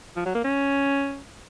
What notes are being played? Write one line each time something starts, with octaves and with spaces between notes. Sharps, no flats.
F3
F#3
A#3
C#4